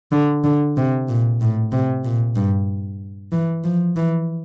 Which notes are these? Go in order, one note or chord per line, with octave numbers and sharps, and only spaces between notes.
D3
D3
C3
A#2
A2
C3
A#2
G2
E3
F3
E3